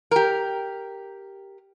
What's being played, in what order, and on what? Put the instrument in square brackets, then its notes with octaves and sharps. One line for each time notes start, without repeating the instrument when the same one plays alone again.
[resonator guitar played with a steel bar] G4 A#4